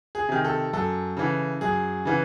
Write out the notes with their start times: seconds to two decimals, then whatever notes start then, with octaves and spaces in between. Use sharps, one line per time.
0.15 G#4
0.29 C3 D#3
0.44 A4
0.73 F#2 A4
1.17 C#3 E3
1.61 F#2 G#4
2.05 C#3 E3